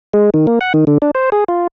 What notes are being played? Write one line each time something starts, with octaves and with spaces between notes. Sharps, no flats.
G#3
D#3
A#3
F#5
D#3
D3
D4
C5
G#4
F4